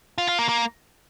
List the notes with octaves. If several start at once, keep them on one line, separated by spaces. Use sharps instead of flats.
F4
F4
A#3
A#3